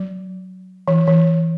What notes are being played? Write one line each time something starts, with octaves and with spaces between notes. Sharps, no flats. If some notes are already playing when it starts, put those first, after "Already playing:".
Already playing: F#3
E3
E3